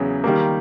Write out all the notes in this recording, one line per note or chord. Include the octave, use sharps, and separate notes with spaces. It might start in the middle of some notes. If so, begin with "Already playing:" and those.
Already playing: E2 C#3 F#3
D#3 G3 A#3